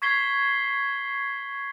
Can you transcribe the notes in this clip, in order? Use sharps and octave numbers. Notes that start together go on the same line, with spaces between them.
C#6 G#6 B6 C7 G7